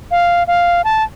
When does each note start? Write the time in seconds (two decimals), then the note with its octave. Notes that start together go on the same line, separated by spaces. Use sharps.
0.11 F5
0.47 F5
0.84 A5